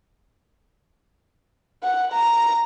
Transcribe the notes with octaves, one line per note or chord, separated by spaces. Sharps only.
F#5
A#5